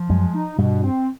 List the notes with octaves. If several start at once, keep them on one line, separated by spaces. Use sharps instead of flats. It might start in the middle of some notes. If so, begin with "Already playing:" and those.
Already playing: F3
F#2 F#3 G#3
D#4
G2 B2 G3
C4